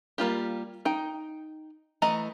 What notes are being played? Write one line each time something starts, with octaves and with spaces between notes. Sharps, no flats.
G3 A#3 F4 G4
D#4 G5
E3 A3 D#5 A#5